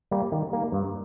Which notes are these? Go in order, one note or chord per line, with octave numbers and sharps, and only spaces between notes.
G3 A#3
D#3
G3 A#3
G2